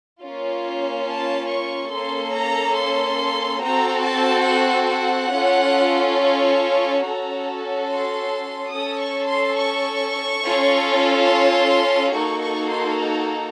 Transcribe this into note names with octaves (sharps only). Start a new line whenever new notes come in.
A#3 C#4 F4
A5
C#6
A#3 C#4 A4 C6
A#5
C6
C4 F#4 A4 A#5
A5
F#5
F#5
C#4 F4 A4
C#6
C#4 F#4 A4 A#5
C6
C#4 A4 D#6
C#6
C6
C#6
C#4 F4 A4
C6
A#3 D#4 F#4 A4 C#6
C#6
C6
A#5